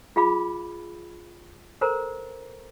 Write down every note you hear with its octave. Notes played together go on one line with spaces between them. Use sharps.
F4 G#4 F5 B5 D6
A4 A#4 C5 A#5